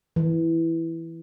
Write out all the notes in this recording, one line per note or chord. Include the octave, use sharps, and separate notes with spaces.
E3